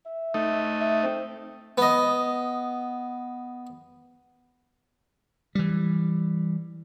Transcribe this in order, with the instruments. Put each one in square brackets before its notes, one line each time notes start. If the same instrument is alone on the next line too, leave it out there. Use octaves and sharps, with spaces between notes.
[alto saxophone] E5
[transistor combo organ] A3 D#4
[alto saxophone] E5
C4
[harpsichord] B3 D#5
[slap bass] E3 G3